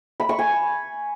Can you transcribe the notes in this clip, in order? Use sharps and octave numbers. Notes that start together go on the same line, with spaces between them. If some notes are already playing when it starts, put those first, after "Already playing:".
B5
C#6
G#5